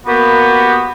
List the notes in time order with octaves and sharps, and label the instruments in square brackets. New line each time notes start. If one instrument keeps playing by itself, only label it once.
[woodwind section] A#3 B3 F#4 G4